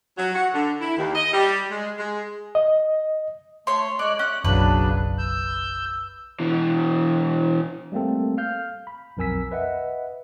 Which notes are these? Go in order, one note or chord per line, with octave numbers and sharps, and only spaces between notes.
F#3
F#4
D3
E4
D#2
D#5
G3
G#3
G#3
D#5
A3 C#5 C6
G#3 C#5 D5 F#6
C#4 F#6
F#1 B1 C#3 F#3 D4 B4
E6 G6
B2 E3
G3 A3 A#3 C4 A4
F5 F6 G6
B5
B1 F2 A#4 G#5 E6 B6
B4 D#5 E5 F#5